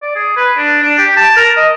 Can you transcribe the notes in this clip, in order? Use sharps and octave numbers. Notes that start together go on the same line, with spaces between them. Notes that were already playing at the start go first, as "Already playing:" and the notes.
D5
G#4
B4
D4
D4
G4
A5
A#4
D#5